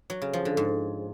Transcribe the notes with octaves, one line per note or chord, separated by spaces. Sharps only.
F#3
C#3
F3
D3
G#2